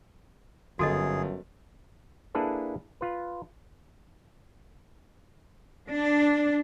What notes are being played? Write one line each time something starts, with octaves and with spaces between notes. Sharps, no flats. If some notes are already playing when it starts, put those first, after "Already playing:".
G1 F#2 F#4 G#4 A4 D#5
A#3 D4 E4 G#4 A4 B4
F4 B4
D4